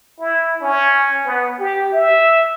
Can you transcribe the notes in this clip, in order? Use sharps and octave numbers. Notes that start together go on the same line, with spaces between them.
E4
C#4
B3
G4
E5